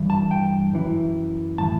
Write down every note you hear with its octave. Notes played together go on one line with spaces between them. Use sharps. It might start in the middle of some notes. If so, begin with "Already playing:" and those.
Already playing: G2 E3
A5
G5
F#2 E3
A2 E3 A5